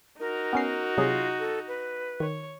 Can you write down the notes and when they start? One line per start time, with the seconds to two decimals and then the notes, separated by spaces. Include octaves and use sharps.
0.20 D#4 F#4 A#4
0.53 B3 C#4 C7
0.97 C3 F#3 F4 G#4
1.39 A4
1.68 B4
2.20 D#3 C#5